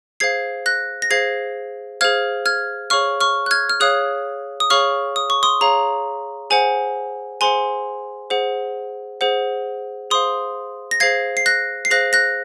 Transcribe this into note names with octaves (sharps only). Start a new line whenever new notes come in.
G#4 C5 F5 G#6 C7
F#6 A#6
A#6
G#4 C5 F5 G#6 C7
G#4 C5 F5 F6 G#6
F6 G#6
G#4 C#5 F5 C#6 F6
C#6 F6
F#6
F6 G#6
F6
G#4 C#5 F5 D#6 F#6
D#6
G#4 C#5 F5 C#6 F6
D#6
C#6
C6 D#6
G#4 C#5 F5 A#5
G#4 C5 F#5 G#5
G#4 C5 F#5 G#5 C6
G#4 C5 F#5
G#4 C5 F#5
G#4 C5 F5 C6 D#6
A#6
G#4 C5 F5 G#6 C7
C7
F#6 A#6
C7
G#4 C5 F5 F#6 A#6
F#6 A#6